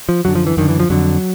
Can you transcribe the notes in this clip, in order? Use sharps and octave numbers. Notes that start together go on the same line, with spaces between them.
F3
F#2 D3 F#3
F3
E3
F#2 D3 D#3
E3
F3
F2 D3 F#3